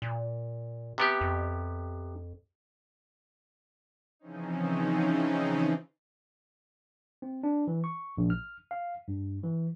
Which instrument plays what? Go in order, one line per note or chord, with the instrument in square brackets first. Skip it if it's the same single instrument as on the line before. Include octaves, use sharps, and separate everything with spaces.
[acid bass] A#2
[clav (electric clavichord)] C3 B3 G4
[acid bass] F2
[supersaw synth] C#3 E3 F3 C4 C#4 D#4
[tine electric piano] C4
D4
E3
C#6
A#1
F6
F5
G2
E3